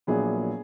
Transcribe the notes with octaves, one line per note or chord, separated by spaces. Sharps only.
A#1 A#2 F#3 B3 G#4